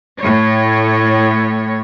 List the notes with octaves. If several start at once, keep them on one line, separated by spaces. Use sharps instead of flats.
A2 C#5